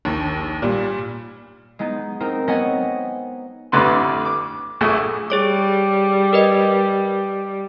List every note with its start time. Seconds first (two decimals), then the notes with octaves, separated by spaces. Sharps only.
0.05 A#1 D#2
0.62 A#2 G3
1.79 G#3 B3 D#4
2.20 C4 D#4 A#4
2.48 B3 C4 C#5 D#5 F#5 G#5
3.72 A1 F2 D3 B4 C6
4.25 D6
4.81 A#1 A#2 A3 G#4
5.30 G3 G#4 C#5 D6
6.33 A#4 B4 D#5